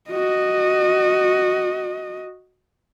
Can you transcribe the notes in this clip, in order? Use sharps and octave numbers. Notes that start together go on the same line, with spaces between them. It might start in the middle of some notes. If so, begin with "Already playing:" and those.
F#4 D#5